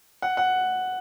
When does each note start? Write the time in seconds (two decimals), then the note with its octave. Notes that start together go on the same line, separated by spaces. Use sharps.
0.22 F#5
0.37 F#5